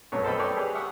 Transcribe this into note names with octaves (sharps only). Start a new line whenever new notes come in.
B1 F#2 F#3 A3 B3 C#5
A4 B4 C5 D#5 G5 B5
A4 B4 C#5 D5 G5
G4 G#4 B4
E5 F#5 G5 C#6 D#6